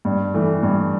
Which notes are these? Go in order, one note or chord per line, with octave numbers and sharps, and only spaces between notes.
G2
E3 A3
G2